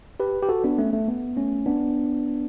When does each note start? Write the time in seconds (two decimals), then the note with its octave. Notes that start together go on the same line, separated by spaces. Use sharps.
0.20 G4 B4
0.43 G4
0.49 F#4 A4
0.64 B3 D4
0.78 A3 C#4
0.93 A3
1.08 B3
1.36 A3 C#4
1.66 B3 D4